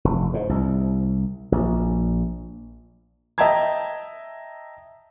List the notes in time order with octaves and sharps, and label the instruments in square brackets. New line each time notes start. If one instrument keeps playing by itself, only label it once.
[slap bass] F1
G#2
C2
A#1
[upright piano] D#5 E5 G5 A5 A#5 G#6